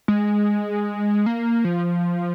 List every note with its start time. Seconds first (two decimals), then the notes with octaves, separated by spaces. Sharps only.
0.08 G#3
1.26 A#3
1.65 F3